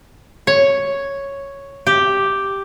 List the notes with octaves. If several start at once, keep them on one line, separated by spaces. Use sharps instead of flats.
C#5
G4